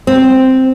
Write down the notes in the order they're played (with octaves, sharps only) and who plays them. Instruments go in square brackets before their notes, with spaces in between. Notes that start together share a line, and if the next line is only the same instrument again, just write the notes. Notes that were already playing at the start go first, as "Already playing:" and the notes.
[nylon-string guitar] C4